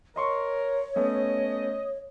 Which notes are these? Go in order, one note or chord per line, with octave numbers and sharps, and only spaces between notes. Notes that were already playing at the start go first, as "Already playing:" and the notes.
A#4 C#5 D#5 C6 C#6
A3 B3 C#4 D#5